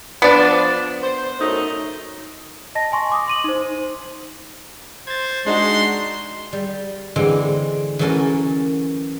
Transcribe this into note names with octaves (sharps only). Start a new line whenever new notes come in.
F3 B3 D4 D5
C5
F#2 A3 D#4
D#5 A5 A#6
G#5 C6 C#6
C6 D6 D#6
C6 D#7 F#7
D#4 C5
C5 G#6 A6
G#3 D4 D#4 F#4 C6
G3
D3 E3 G#3 C4
E3 F#3 A3 C#4 A4 A#4